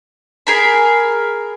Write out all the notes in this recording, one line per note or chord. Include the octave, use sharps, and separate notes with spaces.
G#4 A#4 B5